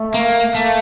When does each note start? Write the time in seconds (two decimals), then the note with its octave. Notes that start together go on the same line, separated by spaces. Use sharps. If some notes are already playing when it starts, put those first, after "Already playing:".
Already playing: A3
0.14 A#3
0.54 A3 A#3